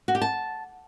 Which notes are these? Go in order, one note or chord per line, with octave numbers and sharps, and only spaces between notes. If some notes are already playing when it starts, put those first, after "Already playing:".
F#4
G4
A5